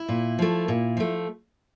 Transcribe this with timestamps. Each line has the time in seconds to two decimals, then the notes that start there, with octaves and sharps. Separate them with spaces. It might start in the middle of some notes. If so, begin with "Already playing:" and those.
Already playing: E4
0.09 A#2
0.39 F3 A3
0.68 A#2
0.97 F3 A3